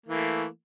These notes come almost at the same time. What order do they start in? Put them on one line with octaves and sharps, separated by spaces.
A#3 E3 A3